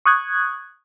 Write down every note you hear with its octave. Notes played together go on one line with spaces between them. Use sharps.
C#6 D#6 F#6 G#6